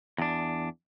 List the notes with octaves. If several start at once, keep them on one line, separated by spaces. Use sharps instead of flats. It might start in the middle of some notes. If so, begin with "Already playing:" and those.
E2 D4